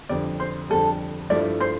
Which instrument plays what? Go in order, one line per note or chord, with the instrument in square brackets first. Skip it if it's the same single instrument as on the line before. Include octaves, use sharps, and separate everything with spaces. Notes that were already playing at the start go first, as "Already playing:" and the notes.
[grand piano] F2 D3 G3 [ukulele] D5
[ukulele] C5
[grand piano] F2 D3 G3 [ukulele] A4
[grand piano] G2 F3 A3 E4 [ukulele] D5
[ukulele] C5